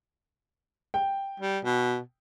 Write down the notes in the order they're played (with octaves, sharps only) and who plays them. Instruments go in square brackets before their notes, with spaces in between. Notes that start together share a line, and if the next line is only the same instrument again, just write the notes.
[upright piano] G5
[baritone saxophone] G3
B2